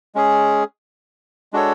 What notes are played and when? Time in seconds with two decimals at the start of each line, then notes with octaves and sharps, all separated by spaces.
0.15 G#3 C#4 G#4
1.53 G#3 D4 F#4 A4 C#5